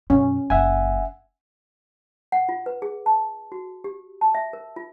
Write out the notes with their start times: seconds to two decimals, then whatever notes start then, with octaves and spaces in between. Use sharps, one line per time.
0.10 F#2 B2 C#4
0.50 F#1 C4 E5 F#5 G#5
2.32 F#5
2.49 F4
2.66 B4
2.82 G#4
3.06 A5
3.52 F#4
3.84 G4
4.21 A5
4.34 E5
4.53 A#4
4.76 F4